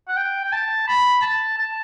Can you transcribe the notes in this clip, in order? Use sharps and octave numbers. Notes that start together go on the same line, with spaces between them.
F#5
G5
G5
A5
B5
A5
A5